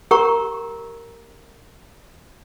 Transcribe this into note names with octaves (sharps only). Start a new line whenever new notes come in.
G4 A#4 F#5 A#5 C#6